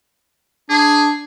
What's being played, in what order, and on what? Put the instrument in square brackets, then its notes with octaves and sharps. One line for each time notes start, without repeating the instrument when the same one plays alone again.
[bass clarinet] D4 [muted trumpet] G#4